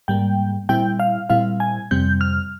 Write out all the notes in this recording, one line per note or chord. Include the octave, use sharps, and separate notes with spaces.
G#2 G3 A#3 G5
A#2 G3 C4 E4 G5
F5
A#2 G3 C4 E4 F5
G#5
F2 C3 G3 C4 G6
F6